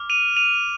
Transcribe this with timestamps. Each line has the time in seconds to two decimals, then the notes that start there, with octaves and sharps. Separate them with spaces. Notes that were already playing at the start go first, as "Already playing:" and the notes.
Already playing: D6 F6
0.10 D#7 F7
0.36 D#7 F7